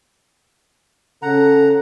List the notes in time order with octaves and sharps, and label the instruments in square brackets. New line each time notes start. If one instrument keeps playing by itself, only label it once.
[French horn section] C#3 A4 [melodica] F#5 A#5